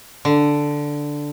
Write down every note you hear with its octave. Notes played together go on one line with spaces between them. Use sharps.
D3